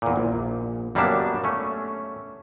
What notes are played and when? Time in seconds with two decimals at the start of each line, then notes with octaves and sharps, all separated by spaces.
0.02 E2 A#2
0.16 A#1
0.95 F#2 G3 A#3 B3 D4 A5
1.44 A3 C#4